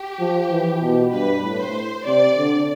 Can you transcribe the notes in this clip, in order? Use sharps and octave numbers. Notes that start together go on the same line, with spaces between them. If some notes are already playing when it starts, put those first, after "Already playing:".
Already playing: G4
F3
E3
B2
G2 B4
A2
C5
C3 D5
D3